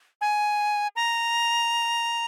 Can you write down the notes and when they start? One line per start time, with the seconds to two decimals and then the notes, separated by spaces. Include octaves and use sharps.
0.21 G#5
0.96 A#5